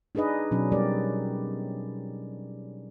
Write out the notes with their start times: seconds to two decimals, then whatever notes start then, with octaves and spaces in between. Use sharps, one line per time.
0.15 D4 D#4 G#4 B4 D#5
0.51 B2 F#3 C#4
0.72 G3 G4 A#4 D5